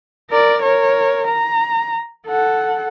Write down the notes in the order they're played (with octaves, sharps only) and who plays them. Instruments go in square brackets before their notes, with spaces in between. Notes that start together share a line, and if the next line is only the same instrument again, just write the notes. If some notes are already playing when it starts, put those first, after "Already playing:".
[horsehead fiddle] A#4 D5
A#4 C#5
A#5
A4 F#5